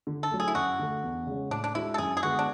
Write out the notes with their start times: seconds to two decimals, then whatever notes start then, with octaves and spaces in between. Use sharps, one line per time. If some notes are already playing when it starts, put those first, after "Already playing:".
0.07 D3
0.23 A4
0.31 F#3 A3
0.40 G#4
0.48 E4
0.55 F#2 F#4
0.79 D3 A3
1.04 E2
1.27 C#3 G#3 C#4
1.51 A2 D4
1.64 D4
1.75 G#3 D4 E4 F#4
1.94 A4
1.98 F#2 G#4
2.17 G#4
2.23 D3 G#3 B3 F#4
2.39 D4